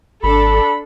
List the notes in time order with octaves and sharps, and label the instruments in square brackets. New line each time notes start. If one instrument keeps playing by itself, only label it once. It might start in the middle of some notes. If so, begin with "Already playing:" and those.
[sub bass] G#1 [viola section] D4 A4 [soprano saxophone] B5